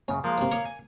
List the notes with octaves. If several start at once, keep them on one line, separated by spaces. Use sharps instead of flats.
F#2 C#3 C#4
F3 G#3 A#3
G#2 C3
A#4 C#5 D6 D#6
G#5